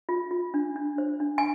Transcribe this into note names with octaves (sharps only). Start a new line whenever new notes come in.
F4
F4
D4
D4
C5
D4
G#5